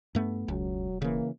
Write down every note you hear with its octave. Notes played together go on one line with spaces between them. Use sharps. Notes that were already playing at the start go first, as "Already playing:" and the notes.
G2 A3 B3
E1 C#2 F#3
C#3 E3 A#3